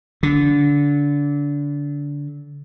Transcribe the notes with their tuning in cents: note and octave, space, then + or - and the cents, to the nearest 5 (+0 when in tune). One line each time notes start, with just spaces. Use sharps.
D3 -25